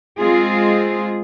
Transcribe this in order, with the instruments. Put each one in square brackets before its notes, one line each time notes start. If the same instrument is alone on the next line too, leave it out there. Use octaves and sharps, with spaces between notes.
[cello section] G#3 C4 F4 G#4